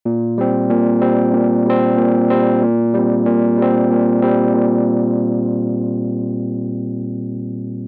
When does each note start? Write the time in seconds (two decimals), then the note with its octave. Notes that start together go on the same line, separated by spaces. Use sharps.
0.05 A#2
0.38 G3 C4
0.70 A#2
1.01 G3 C4
1.33 A#2
1.66 G3 C4
1.97 A#2
2.30 G3 C4
2.63 A#2
2.94 G3 C4
3.26 A#2
3.58 G3 C4
3.91 A#2
4.22 G3 C4
4.54 A#2